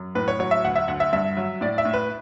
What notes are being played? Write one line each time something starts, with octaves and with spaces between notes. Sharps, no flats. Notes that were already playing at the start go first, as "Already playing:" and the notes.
Already playing: F#2
A2 B4
C#5
F#3 C#5
E5
D2 F#5
E5
D2 F#5
E5
G2 E5
F#3
A2 D5
E5
A2
B4